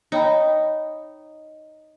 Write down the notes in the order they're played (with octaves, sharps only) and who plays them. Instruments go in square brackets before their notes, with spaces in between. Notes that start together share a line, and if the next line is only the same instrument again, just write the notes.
[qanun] D#4 [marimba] C#5 G5 B5